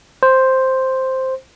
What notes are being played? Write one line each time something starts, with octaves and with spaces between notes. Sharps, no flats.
C5